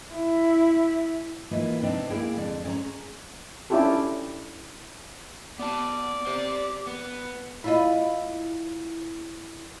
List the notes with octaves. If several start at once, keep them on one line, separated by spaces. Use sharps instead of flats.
E4
E3 A#3 D#4 F4 B4
C3 B3 C4 D4 D#4
A#3 E4 G#4 G5 G#5
F2 D3 D4
C#4 E4 G#4 C5 A#5
C#4 D4 E4 F4 G4 A4
B3 D5 A5
G4 C5
B3
E4 F4 D#5